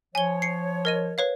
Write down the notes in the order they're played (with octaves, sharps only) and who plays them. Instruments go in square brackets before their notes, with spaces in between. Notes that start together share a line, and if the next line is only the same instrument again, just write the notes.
[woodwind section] F3 C#5 [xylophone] G#5 G7
[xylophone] C7 C#7
A#4 D#5 D#7
B4 C#5 F5